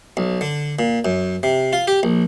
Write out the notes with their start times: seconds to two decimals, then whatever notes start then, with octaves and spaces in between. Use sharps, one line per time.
0.17 B1
0.41 D3
0.79 A#2
1.05 F#2
1.43 C3
1.73 F4
1.88 G4
2.03 A#1